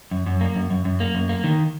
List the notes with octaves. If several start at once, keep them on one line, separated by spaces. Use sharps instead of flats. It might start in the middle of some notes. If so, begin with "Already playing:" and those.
F#2
F#2
A#3
F#2
F#2
F#2
A#3
F#2
A#3
D#3